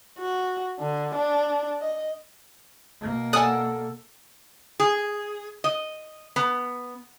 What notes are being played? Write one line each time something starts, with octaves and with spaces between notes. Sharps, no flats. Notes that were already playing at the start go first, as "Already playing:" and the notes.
F#4
D3
D4
D#5
B2 A#3
A4 D5 F#5 G#5 A5 D#6 F#6
G#4
D#5
B3